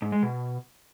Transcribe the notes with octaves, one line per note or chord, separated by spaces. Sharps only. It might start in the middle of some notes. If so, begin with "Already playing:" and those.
G#2
G#3
B2